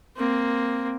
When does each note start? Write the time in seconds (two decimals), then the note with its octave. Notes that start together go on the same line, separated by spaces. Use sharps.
0.16 A#3 C4